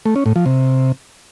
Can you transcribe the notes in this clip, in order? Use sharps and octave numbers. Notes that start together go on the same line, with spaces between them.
A3
C#4
A2
F3
C3